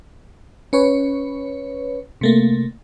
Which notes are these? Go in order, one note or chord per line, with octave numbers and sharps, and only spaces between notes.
C#4 B4 C#5
C3 A3 A#3